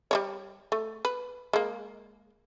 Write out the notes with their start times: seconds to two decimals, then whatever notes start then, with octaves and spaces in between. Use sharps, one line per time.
0.11 G3 A3 C#5
0.72 A3
1.05 B4
1.53 G#3 A#3